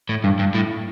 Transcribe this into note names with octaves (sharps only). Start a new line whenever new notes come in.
A2
G2
G2
A2